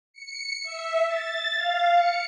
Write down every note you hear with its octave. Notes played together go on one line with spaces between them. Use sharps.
C#7
E5
A6
F5
C#7